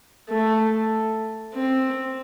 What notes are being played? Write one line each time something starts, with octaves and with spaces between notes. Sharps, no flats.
A3
C4